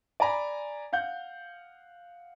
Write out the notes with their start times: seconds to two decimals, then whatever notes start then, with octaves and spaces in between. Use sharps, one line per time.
0.20 D5 G#5 A#5 B5
0.93 F5 F#5 G6